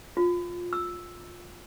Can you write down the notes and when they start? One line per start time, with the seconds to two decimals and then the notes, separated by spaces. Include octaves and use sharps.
0.17 F4
0.73 E6